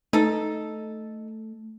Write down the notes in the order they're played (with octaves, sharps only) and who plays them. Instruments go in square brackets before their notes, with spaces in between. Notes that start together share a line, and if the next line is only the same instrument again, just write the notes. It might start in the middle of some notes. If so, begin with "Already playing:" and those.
[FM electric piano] A3 [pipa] D#4 A4